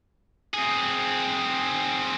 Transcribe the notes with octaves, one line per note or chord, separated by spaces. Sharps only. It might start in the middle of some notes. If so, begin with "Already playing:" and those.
C4 G#4